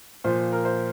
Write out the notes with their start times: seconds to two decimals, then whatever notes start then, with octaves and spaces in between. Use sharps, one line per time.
0.24 A#2 F3 C5
0.52 A#4
0.65 C5